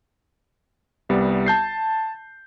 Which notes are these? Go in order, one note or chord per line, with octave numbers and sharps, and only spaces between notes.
C2 G3 B3
A5 G6 C7